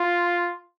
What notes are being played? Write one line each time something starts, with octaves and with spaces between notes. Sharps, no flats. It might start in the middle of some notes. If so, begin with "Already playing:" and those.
Already playing: F4